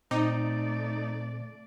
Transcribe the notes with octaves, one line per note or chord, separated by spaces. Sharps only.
A#2 A3 C4 D#4 D5 D6